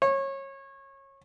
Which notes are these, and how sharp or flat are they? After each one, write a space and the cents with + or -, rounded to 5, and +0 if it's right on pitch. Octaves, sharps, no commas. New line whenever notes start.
C#5 -25